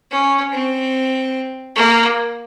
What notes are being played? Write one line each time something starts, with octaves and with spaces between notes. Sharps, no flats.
C#4
C4
A#3